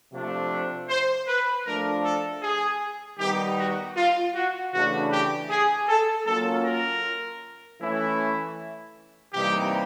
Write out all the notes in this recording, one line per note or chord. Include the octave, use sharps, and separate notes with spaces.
C3 F3 A3 D4
C5
B4
F3 A3 D4 A#4
A4
G#4
D#3 G3 B3 D#4 G4
F#4
F4
F#4
C#3 E3 A3 D4 F#4
G4
G#4
A4
F#3 A#3 C#4 F4 A4
A#4
E3 A3 C#4 E4
C3 E3 G3 A#3 D#4 G4